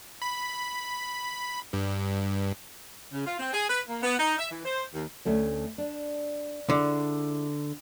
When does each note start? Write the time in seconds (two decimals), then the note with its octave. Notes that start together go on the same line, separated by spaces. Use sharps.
0.22 B5
1.73 G2
3.13 C#3
3.27 F4
3.39 C4
3.53 G#4
3.69 B4
3.89 A#3
4.03 B3
4.19 D#4
4.39 E5
4.51 E3
4.65 C5
4.94 D#2
5.25 D2 A3 C#4
5.78 D4
6.70 D3 G#3 E4